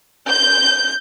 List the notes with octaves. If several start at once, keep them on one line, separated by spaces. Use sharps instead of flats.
G6